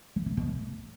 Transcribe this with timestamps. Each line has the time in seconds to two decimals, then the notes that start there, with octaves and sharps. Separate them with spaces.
0.16 E3
0.26 C#3
0.37 B2
0.49 A2